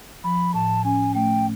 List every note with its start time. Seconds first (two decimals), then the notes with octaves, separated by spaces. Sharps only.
0.24 F3 B5
0.54 A2 A5
0.85 C#4 G#5
1.15 A3 G5